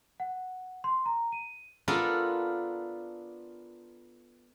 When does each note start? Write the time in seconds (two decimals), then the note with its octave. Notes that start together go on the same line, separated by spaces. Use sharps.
0.20 F#5
0.84 C6
1.06 A#5
1.32 D#7
1.88 B3 D4 F4 A4 A#4